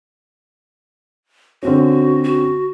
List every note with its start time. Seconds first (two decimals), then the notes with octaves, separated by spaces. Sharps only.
1.63 D3 C4 C#4 F#4
2.24 F#4